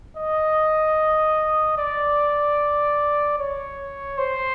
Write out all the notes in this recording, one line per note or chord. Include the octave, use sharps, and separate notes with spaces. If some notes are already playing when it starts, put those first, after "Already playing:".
D#5
D5
C#5
C5